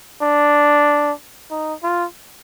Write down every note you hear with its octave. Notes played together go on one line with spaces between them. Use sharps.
D4
D#4
F4